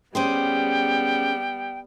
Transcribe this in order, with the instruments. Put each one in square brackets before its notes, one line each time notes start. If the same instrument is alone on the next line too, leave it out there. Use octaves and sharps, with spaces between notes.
[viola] G3 B3 [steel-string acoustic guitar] C#4 G#4 C5 [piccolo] G5